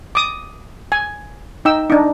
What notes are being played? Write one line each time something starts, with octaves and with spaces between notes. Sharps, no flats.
D6 D#6
G#5
D#4 G5 E6
D4 D#4